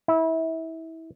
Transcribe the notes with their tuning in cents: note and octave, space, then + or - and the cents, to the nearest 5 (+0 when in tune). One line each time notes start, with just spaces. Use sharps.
E4 -25